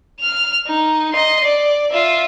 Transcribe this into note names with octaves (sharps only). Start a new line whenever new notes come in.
F6 F7
D#4
D#5 C6
D5
F4 E5